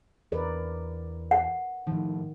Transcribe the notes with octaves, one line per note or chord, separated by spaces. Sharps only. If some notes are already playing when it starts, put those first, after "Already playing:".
E2 A#4 B4 D5
F#5
A2 D#3 F3